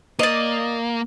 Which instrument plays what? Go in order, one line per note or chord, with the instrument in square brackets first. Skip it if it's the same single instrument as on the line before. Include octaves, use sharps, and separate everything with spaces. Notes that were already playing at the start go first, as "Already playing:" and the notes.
[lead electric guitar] A#3 [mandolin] D5 D#5